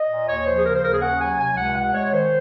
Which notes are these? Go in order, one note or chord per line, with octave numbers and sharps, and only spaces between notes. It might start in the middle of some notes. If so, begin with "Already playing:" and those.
Already playing: D#5
A#2
D#2 C#5
F3 C5
G#4
C#3 A#4
C5
D#2 A#4
G#4
C#4 F#5
F#3 G#5
C3 G#5
C#2 F#5
C3 F#5
G#3 C#5
D#3 C5